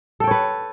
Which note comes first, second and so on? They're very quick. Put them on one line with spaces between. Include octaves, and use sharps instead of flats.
A4 G5 C#5 B4